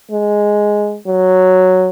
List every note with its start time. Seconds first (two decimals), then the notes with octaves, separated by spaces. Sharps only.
0.11 G#3
1.07 F#3